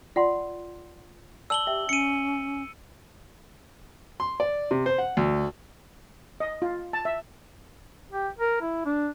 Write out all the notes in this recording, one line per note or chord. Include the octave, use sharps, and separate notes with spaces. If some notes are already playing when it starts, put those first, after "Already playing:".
F4 D5 F#5 C6
D5 A5 E6 F#7 G7
G4 E5 G5
C#4 C#7 D#7
C6
D5
C3
C5
F#5
D2
D#5
F4
A5
E5
G4
A#4
E4
D4